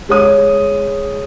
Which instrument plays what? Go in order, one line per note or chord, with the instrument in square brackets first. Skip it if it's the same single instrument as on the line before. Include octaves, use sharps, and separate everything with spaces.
[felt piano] G#3 C#5 D#6